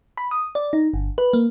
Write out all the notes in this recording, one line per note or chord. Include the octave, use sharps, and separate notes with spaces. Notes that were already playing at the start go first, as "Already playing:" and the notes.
B5
D#6
D5
D#4
G1
B4
A#3